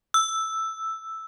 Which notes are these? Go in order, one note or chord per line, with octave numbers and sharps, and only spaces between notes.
E6